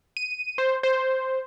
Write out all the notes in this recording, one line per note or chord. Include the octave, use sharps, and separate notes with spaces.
D#7
C5
C5